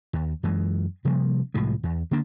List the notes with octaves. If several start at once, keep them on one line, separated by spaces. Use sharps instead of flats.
D#2
F#2 E3 G#3
C3 F3 G3 A#3
C2 A2 F3 G#3
E2
D3 A#3 D4